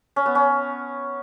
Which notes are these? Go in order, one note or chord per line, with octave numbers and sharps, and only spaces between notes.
C#4
B3
C#4